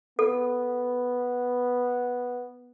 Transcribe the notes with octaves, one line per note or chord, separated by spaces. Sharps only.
B3 A4